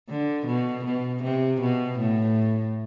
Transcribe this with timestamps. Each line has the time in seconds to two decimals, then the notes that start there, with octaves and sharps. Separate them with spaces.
0.09 D3
0.47 B2
0.85 B2
1.23 C3
1.61 B2
1.99 A2